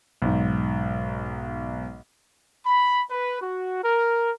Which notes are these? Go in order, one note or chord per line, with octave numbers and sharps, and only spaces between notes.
B1 G#2
B5
B4
F#4
A#4